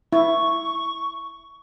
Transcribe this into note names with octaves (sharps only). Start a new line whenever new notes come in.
E4 C#6